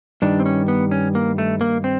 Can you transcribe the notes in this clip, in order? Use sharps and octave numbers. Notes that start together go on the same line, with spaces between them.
G2 D#3 G3 D4
C4
C#4
B3
C#4
A#3
A3
A#3
C4